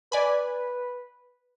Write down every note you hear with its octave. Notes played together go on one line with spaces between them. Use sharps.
B4 D5 G#5 B5